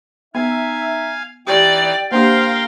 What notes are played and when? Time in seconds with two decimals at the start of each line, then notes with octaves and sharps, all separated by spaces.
0.35 B3 D#4 E5 F5 G#5
1.47 E3 D#4 G4 D5 G5
2.11 A#3 D4 G4 A#4 C5 F5 G5 C6